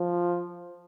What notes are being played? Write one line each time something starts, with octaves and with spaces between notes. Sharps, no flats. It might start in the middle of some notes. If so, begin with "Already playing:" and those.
Already playing: F3